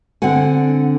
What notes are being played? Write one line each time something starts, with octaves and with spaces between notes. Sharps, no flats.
D3 C4 D4 F#5 G#5